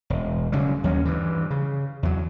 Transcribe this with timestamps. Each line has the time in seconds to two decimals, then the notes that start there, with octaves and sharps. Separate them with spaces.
0.10 E1
0.52 D2 C#3 F#3 G3
0.84 D#2 F#3 A#3 C#4
1.05 G2 E3
1.50 C#3
2.03 E2 F#3